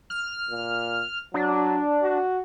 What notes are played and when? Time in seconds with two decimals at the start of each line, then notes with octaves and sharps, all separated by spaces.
0.10 F6
0.50 A#2
1.34 F#3 D4
2.02 F#4